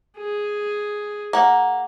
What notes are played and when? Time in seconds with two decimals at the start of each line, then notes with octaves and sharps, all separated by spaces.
0.18 G#4
1.33 A#3 F#5